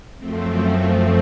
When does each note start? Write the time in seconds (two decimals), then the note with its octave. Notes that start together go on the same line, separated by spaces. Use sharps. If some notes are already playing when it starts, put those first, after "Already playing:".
0.17 F#2 F3 A3 C4